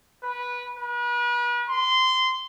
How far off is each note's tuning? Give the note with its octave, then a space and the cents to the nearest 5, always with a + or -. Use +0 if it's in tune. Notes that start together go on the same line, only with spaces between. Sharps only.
B4 -15
B4 -40
C6 -15